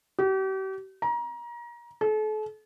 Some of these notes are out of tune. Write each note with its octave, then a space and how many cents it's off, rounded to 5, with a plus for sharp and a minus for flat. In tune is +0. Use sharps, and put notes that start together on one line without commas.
G4 -40
A#5 +30
A4 -40